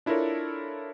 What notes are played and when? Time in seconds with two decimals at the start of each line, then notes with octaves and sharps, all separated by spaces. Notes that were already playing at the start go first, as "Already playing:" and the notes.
0.06 D4 E4 F4 A4 A#4 C#5